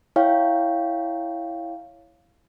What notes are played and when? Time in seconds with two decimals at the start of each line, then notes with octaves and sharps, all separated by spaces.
0.16 E4 C#5 F5 G5